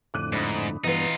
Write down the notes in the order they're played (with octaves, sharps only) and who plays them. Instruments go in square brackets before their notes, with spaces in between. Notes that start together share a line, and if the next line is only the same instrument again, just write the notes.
[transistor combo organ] F2 A2 D3 [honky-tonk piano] D6 F#6 D#7
[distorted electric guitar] G#2 [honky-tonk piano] D4 B5 D#6
[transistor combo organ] G2 B3 [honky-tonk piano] E3 B4 [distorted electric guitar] D#4 F4